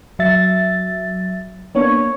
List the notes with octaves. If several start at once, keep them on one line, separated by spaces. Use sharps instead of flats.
F#3 E5 A6
A#3 B3 D4 C#5